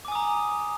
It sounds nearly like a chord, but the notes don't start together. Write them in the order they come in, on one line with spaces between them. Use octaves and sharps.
D6 G#5 D#6 A#5